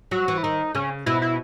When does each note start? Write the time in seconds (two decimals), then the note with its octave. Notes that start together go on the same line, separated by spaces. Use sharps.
0.11 F#3 F#4
0.28 E3
0.38 E4
0.43 D#3 D#4
0.75 C#3 C#4
1.06 B2 E4
1.22 E4